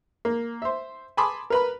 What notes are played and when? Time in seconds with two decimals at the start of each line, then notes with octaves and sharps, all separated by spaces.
0.25 A#3
0.62 C5 E5
1.17 G#5 A5 B5 C6 D6 D#6
1.50 A#4 B4 B5